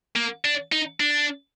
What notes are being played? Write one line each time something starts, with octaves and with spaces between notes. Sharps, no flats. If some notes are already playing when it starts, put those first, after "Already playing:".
A#3
D4
D#4
D4